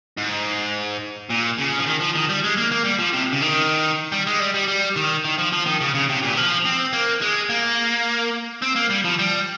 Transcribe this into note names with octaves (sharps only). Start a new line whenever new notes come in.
G#2
A#2
C#3
F3
D#3
F3
D#3
G3
G#3
A#3
A#3
G3
F3
C3
C#3
D#3
G3
G#3
G3
G3
G3
D#3
D#3
F3
F3
D#3
C#3
C#3
C3
A#2
D#3
F3
C4
A#3
G#3
A#3
C4
A#3
G3
F3
G3